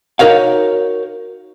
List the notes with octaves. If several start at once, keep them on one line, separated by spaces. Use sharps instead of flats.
D#4 F#4 A#4 C#5 F5